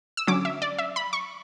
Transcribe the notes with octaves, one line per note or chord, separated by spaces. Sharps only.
E6
D3 F#3 C#4 D6
E5
D5
E5
B5
C#6